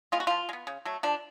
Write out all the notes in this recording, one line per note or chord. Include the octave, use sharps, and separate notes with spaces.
G#3 B3 F4
F#4
F3 F4
G#3
B3
C#3
F#3 A3
F3 D4